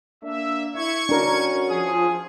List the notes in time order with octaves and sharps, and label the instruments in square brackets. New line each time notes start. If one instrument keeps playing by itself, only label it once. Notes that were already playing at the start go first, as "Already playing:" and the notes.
[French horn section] A#3 D4 [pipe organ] E5
[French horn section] E4 [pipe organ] C#6 G#6
[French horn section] C#4 F#4 [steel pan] D4 A#4
[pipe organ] F3 [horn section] G#4